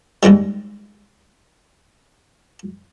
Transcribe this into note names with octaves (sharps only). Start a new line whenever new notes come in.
D#2 G#2 D#3 G3